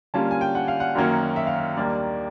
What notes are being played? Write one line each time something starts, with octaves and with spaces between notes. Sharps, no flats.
D3 G3 A#3 C#4 F4 A5
G#5
G5
F#5
F5
F#5
F#2 D#3 F#3 A#3 C#4
E5
F5
E5
D#2 D#3 G3 A#3 D4 D5